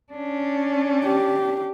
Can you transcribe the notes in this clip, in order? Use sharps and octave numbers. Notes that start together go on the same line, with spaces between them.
C#4 D4
G4